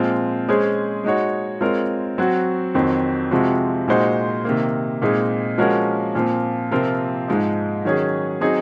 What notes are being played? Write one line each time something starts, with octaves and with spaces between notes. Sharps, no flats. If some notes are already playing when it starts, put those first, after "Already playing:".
Already playing: A#2 F3 G#3 C4 F4
G#3 C#4 G#4 C5
G#3 D#4 F#4 C#5
G#3 C4 F4 A#4 C#5
F#3 C4 F#4
F2 D#3 F#3 C4
C3 F3 G#3 C4 F#4
A#2 G#3 D#4 F#4 C5
C3 D#3 A#3
A#2 G#3 C4 D#4 G#4
F3 G#3 C#4 F#4 A#4
A#2 F3 C4
C3 F3 C4 F4 A#4
G#2 F3 G#3 D#4
D#3 F#3 C#4 G#4
F#3 C4 D#4 G#4